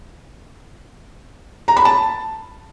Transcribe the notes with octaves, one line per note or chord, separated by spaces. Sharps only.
A#5
B5
A5